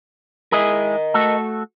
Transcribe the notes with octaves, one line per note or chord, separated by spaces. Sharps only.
G#3 E4 G#4 A#4 D#5
A3 F#4 A4